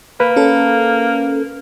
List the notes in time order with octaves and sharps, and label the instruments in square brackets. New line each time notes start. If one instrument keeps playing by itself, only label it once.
[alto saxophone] A#3 [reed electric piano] B4
[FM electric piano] C#4 A4